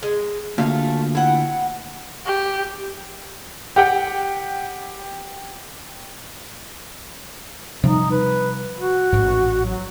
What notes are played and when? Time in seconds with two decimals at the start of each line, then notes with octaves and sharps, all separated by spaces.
0.03 G#3
0.58 D2 A#2 A3 F5
1.15 E4 F#5 G5
2.26 G4
3.76 G4 F#5 G5
7.84 C3 F3 G3 D#4
8.12 B4
8.78 F#4
9.12 A1 G#2
9.65 F#3